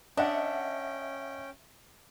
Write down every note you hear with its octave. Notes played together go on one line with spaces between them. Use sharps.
C#4 D4 D#5 E5 F#5 G5